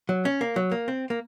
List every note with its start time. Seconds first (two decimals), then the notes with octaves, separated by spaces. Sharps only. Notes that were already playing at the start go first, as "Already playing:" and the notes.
0.09 F#3
0.25 C#4
0.41 A#3
0.56 F#3
0.72 A#3
0.88 C4
1.10 A#3